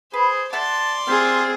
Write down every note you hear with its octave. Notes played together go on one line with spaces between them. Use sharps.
G#4 B4 C5
G#4 D5 E5 F#5 A5 C6
C4 F4 G4 G#4 A#4